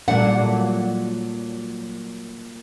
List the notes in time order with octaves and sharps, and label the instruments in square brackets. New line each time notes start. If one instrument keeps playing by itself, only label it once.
[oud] A#2 F#3 [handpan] G3 A3 D4 [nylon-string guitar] F#5